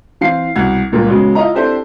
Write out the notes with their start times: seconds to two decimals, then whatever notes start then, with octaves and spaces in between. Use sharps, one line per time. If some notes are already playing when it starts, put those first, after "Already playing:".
0.21 E3 C4 F5 C7
0.56 C2 B2 F#5 G#6
0.92 C#2 G2 A#2 A#3
1.06 C#3 F#3 G#3 B3 F#4
1.35 E4 F4 D#5 A#5
1.55 C4 D4 E4 G4 A4 C5